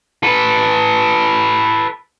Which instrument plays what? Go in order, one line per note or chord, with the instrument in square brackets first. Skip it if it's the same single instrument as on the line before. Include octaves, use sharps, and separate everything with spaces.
[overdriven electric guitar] A4 B4